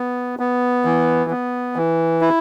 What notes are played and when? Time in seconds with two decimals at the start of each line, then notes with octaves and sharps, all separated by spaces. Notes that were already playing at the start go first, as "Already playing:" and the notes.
Already playing: B3
0.39 B3
0.85 E3
1.30 B3
1.76 E3
2.21 E4